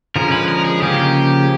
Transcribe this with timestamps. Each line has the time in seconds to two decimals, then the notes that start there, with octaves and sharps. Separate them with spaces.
0.16 D3 F3 G#3 C#4 A#4
0.32 B4
0.48 A#4
0.65 G#4
0.82 C#3 F3 A#3 C#4 G4